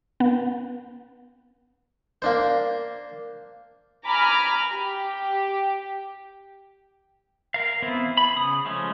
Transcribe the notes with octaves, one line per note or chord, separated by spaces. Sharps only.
B3
A#3 D4 C5
G#5 A#5 B5 D6 F6
G4
A#4 F5
E3 B3 C4 E4
B5
C#3 D#6
F3 G#3 A3 C#4